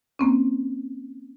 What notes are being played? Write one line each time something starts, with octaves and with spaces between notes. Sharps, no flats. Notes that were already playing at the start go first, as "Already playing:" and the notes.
A#3 C4 C#4